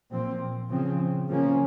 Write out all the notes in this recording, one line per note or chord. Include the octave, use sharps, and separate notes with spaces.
A#2 F3 C4
C#3 F3 C4
C#3 F3 A#3 C#4